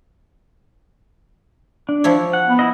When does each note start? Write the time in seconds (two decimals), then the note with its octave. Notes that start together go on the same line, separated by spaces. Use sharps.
1.89 D4
2.04 F3 E4 C#5
2.33 F#5
2.47 B3
2.59 E4 D#5